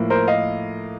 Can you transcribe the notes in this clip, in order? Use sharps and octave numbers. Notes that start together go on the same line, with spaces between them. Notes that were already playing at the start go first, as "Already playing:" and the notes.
Already playing: A2 F3 A#3
A#4 C5
D#5 F5